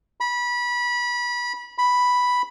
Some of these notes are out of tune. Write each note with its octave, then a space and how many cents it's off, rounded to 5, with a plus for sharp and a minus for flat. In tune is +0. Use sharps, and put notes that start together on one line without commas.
B5 -25
B5 +0